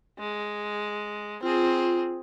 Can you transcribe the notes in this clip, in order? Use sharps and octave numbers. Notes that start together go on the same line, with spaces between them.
G#3
C4 F4 G#4